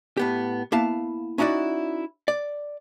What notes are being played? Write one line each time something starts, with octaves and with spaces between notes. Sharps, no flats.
A2 B3 G4
A#3 B3 E4 F5 A5
C#4 D#4 E4 F#4 D5
D5